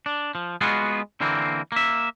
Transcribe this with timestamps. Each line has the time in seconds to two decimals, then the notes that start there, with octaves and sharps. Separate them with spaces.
0.06 D4
0.35 F3
0.61 G#3 B3 F4 F#4 G#4
1.20 D3 E3 A#3 C4
1.72 A#3 E5